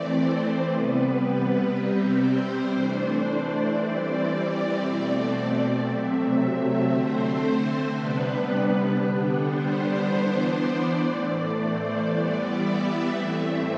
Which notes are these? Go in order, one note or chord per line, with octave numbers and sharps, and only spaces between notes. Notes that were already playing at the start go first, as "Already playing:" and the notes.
Already playing: E3 A3 C4 D5
C5
C3 G3 B3 B4
C3 G3 C4
C5
E3 A3 D4
D5
E3 G3 C4
B2 A3 C4 D5
C3 F#3 A3 C4 E5
D3 A3 C4 C5
C3 G3 B3 D4 B4
D3 G3 B3 D4
C5
E3 B3 D4 C5
D5
A2 E3 A3
C5
E3 G3 B3 D5
E5
A2 E3 A3 C4